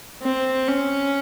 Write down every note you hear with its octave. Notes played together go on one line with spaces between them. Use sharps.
C4
C#4